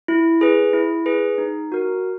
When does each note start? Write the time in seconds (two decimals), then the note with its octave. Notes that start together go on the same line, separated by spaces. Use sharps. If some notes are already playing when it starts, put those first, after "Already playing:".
0.08 E4
0.41 G#4 B4
0.73 E4
1.06 G#4 B4
1.38 D#4
1.72 F#4 A#4